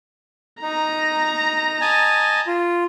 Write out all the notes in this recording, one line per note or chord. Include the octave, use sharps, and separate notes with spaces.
D#4 A#5
D#5 G#5 A5
F4